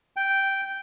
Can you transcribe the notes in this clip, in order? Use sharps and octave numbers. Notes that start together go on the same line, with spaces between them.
G5